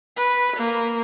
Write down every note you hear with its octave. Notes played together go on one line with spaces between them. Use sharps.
B4
A#3